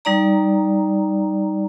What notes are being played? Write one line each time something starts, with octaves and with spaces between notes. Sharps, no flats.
G3 D#4 D5 A#5